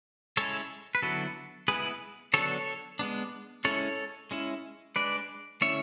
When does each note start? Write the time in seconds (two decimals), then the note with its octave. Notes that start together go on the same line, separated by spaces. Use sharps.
0.37 G#3 C#4 E4 A4 C#5
0.95 B4
1.02 D3 F#3 B3 E4 F#4 A4
1.68 G#3 B3 E4 G#4 B4
2.33 D3 F#3 B3 D4 A4 C#5
2.99 G#3 B3 D4
3.65 G#3 C#4 E4 A4 C#5
4.31 G#3 C#4 E4
4.96 G#3 D4 B4 D5
5.61 D3 A3 C#4 E4 C#5 E5